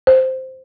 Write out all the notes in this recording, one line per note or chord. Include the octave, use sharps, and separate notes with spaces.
C5